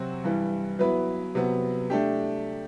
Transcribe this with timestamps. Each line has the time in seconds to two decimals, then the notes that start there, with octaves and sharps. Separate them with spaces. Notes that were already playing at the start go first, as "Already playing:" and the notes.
Already playing: C3 F#3 C4 F#4
0.24 G2 E3 G3
0.79 F#3 B3 E4 B4
1.35 C3 F#3 B3
1.90 A3 D4 G4